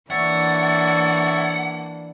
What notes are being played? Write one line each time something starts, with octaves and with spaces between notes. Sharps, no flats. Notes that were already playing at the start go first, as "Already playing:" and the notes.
E3 A#3 D4 C#5 E5 F#5 A6